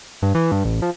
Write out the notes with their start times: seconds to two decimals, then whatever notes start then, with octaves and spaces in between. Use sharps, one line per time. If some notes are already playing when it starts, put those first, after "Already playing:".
0.22 G2
0.35 E3
0.52 G2
0.65 A1
0.82 F3